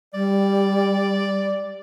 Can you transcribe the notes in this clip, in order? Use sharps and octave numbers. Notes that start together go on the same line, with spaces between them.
G3 D5